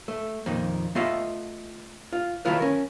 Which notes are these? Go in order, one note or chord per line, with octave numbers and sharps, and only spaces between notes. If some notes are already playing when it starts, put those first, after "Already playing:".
A3
F2 A#2 D#3
A3 B3 F4 D#5 E5
F4
D#3 F#3 A3 E4 F4 B4
C#4 A#4